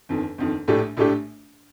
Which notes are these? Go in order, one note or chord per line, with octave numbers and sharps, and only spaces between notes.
G1 F2 D#3
G1 F2 D#3
A#1 A2 A3 D4 G4
A#1 A2 A3 D4 G4